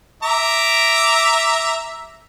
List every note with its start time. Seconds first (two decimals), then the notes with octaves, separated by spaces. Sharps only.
0.23 E5 A#5 D6